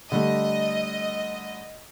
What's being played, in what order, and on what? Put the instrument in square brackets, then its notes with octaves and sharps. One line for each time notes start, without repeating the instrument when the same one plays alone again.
[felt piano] D3 G3 A3 [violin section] D#5